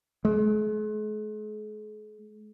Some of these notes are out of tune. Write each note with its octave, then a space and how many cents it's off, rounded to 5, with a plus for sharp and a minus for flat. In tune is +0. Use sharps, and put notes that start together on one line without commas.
G#3 +45